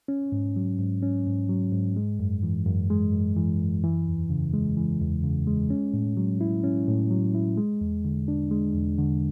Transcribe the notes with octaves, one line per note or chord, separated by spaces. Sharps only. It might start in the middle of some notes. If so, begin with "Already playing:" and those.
C#4
G#2
F#3
G#2
C#4
G#2
F#3
G#2
G#3
F#2
E3
F#2
G#3
F#2
E3
F#2
E3
E2
C#3
G#3
E3
E2
C#3
G#3
C#4
A2
F#3
E4
C#4
A2
F#3
E4
G#3
E2
D3
D4
G#3
E2
D3